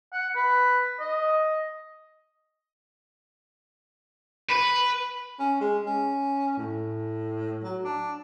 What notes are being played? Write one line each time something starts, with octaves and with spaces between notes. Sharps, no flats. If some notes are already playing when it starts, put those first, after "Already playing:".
F#5
B4
D#5
B4
C#4
G#3
C#4
A2
F#3
D4